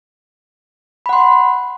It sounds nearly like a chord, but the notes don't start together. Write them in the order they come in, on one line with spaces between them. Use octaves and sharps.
B5 F#5 C6